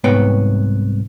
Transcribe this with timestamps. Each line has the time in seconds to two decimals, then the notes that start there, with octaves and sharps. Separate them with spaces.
0.04 C2 G#2 B3 B4 C#5 G5